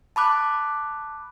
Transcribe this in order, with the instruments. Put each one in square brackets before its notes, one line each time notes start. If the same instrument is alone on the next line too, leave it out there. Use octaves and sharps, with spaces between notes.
[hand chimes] A5 B5 D6 F#6